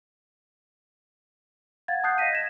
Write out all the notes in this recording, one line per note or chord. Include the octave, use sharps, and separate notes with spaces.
F5 F#5 G#6 A6
F#5 A5 D#6 F#6 G6 C7
D#5 F5 A#6 B6 D#7
G#6 E7